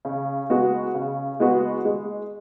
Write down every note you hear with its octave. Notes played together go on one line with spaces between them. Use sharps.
C#3
G#3 B3 F#4
C#3
G#3 B3 F#4
G#3